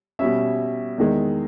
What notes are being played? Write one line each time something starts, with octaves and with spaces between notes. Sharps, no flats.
B2 G3 C#4 E5
E2 D#3 G#3